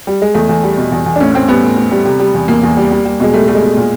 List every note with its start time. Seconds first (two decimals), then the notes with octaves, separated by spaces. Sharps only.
0.07 G3
0.22 G#3
0.34 E2 A3
0.49 E2
0.63 G3
0.78 B2
0.92 E2
1.06 E2
1.16 D4
1.20 A2 C#4
1.34 A2 C4
1.48 G3 B3
1.63 A2
1.77 A2
1.91 G3
2.05 C3
2.20 G3
2.34 E2
2.48 E2 A#3
2.63 E2
2.77 G3
2.91 G3
3.05 G3
3.20 B2 G#3
3.34 G3 A3
3.48 G3 A3
3.55 G#3
3.62 B2
3.77 A#2